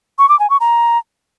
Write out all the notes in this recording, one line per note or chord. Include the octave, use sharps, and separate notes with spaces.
C#6
D6
G#5
C#6
A#5